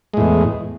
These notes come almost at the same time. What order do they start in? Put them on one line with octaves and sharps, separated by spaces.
G#3 A2 E2